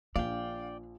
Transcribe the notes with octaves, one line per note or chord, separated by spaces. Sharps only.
A#1 D4 D5 F5 G5